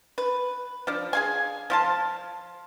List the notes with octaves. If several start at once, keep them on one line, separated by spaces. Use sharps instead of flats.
B4
F3 D4
G#4 F5 G#5
F3 F4 A5